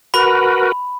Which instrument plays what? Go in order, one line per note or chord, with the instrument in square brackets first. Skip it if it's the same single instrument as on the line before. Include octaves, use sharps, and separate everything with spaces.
[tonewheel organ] F#4 A#4 B4 [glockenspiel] B5